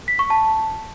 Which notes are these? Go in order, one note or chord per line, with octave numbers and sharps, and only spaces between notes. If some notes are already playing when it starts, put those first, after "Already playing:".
B6
C#6
A5